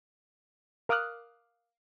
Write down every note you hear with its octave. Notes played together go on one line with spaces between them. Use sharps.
A#4 F5 D6 D#6 F6 F#6